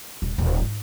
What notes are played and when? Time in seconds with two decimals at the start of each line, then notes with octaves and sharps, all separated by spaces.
0.22 D#1
0.38 D#1
0.61 G#2